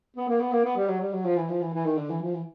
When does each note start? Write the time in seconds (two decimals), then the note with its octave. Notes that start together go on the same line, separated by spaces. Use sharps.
0.17 B3
0.29 A#3
0.40 B3
0.53 A#3
0.65 B3
0.77 G3
0.88 F#3
1.01 G3
1.13 F#3
1.25 F3
1.37 E3
1.49 F3
1.62 E3
1.74 E3
1.86 D#3
1.98 D3
2.10 E3
2.22 F3
2.34 E3